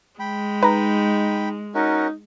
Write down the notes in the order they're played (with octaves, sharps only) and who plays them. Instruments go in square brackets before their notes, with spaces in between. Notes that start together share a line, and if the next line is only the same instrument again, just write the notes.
[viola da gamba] G#3 [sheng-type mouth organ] G5 B5
[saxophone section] D#4 [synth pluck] B4 A#5
[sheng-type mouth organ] C#4 F#4 A#4 [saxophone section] D#4